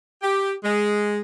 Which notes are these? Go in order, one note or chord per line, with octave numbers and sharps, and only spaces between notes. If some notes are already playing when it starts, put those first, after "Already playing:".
G4
G#3